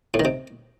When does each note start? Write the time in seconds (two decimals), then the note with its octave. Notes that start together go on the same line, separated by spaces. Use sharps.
0.14 A2
0.20 D#3
0.25 C3